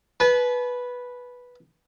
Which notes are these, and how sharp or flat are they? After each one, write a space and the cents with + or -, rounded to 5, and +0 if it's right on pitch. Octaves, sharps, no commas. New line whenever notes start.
B4 -5 A5 -45